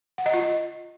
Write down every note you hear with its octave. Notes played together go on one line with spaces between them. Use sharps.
F#5
D#5
F4